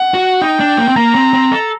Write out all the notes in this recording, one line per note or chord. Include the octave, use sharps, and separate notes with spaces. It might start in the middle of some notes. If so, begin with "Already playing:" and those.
Already playing: F#5
F#4
D#4 G5
D4
A#3
C4
A#3 A#5
C4
C4
A4